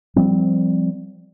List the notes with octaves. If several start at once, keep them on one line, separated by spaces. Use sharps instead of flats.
F3 G3 C4